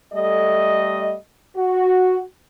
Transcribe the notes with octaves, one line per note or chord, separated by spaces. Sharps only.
G3 A3 A4 D#5
F#4